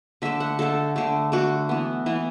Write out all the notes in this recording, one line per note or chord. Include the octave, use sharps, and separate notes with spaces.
D3 A3 E5
F#5
D3 A3 A4
D3 A3
D3 A3 F#4
E3 B3
E3 B3